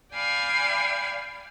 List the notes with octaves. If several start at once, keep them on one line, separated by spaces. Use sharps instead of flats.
D5 F5 G5 G#5 B5